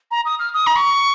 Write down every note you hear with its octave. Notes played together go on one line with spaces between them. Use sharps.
A#5
D#6
F6
D#6
A#5
C#6